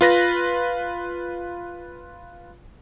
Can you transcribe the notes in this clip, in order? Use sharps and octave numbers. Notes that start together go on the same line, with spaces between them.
F4 B4 A#6